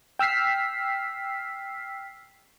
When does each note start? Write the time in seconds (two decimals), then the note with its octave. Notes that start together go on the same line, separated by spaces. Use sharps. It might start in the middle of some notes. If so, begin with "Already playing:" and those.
0.19 G5 E6 F6 B6 C7